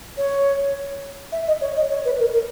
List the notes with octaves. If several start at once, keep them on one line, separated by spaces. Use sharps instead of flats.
C#5
E5
D#5
C#5
D#5
C#5
B4
A#4
A#4